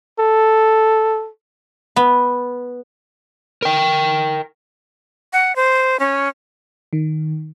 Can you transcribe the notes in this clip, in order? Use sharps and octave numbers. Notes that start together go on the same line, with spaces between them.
A4
B3
A#4 G5
F#5
C5
C#4
D#3